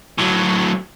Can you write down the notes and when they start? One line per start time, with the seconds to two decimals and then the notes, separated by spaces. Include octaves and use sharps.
0.19 A2 F#3